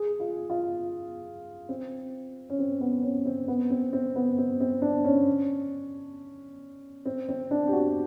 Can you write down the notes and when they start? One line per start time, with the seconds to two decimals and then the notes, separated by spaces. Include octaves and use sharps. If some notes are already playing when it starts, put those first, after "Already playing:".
Already playing: G#4
0.20 F4
0.50 F4
1.69 C4
2.50 C#4
2.59 C4
2.81 B3
3.03 C#4
3.25 C4
3.48 B3
3.70 C4
3.93 C4
4.16 B3
4.38 C4
4.60 C4
4.82 D4
5.05 C#4
7.05 C4
7.29 C4
7.51 D4
7.68 G4
7.73 F#4